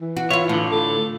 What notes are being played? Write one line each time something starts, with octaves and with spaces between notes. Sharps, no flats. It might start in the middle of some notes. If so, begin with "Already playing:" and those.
E3
F#4
E4 F4 C#5
A2 D3 F4
A4